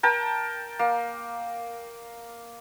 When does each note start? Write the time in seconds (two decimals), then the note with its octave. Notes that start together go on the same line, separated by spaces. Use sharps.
0.03 A#4 G5 A5
0.79 A#3